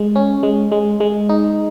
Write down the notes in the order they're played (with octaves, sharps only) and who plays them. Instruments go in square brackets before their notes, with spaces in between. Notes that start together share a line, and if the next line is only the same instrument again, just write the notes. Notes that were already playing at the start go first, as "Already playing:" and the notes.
Already playing: [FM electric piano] G#3
C#4
G#3
G#3
G#3
D#4